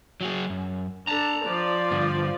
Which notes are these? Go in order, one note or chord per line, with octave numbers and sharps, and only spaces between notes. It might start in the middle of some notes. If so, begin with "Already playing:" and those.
F#3 F#4 G#4
F#2
D4 A4 A5 A#5
F3 D5
G2 D3